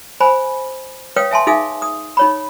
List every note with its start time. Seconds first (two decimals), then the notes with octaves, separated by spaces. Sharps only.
0.20 C5 G#5 B5
1.16 B4 C#5 F5 G5 D#6
1.31 E5 G#5 A5 C6
1.47 D#4 G#4 E5 F5 G#5 D#6
1.82 D#6
2.17 D#4 C#5 B5